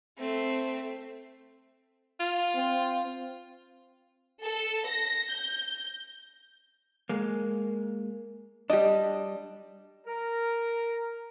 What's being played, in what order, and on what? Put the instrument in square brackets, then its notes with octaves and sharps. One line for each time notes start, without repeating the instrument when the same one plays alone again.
[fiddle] A3 C4
[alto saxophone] F4
[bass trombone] C4
[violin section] A4
A#6
G6
[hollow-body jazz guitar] G#3 A#3
[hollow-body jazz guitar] G3 D4 [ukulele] G4 D#5
[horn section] A#4